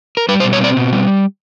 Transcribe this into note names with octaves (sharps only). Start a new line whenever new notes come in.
A#4
G3 B4
C5
B2
C#5
C4 D5
B2
G3